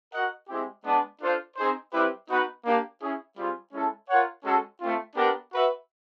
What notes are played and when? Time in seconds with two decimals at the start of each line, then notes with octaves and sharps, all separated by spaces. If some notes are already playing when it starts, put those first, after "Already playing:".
0.13 F#4 A#4 D#5 F#5
0.48 G#3 C4 E4 G4
0.84 G#3 B3 D4
1.20 D4 F4 A4 C5 F5
1.56 C4 D#4 G#4 C5
1.93 G3 C4 E4 G4 B4
2.29 B3 D#4 F#4 B4
2.65 A#3 D4 G4
3.01 C#4 E4 G#4
3.36 G3 C4 F4 G#4
3.73 G#3 C#4 E4 A4
4.08 F4 A#4 C#5 F#5
4.44 G#3 C#4 F#4 A4
4.81 A3 C4 F4
5.16 B3 D4 G4 A#4
5.52 F#4 B4 E5